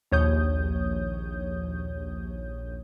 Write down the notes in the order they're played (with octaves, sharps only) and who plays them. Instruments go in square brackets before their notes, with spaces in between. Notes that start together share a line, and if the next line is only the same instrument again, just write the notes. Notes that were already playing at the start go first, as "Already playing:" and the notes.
[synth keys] A#1 D#2 C#5 D#6 G6